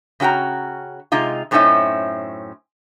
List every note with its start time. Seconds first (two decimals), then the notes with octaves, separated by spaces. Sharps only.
0.20 C#3 C#4 F#4 G5 A#5
1.12 C3 G#3 D#4 F4
1.51 F#2 A2 C4 C#4 D#4 E5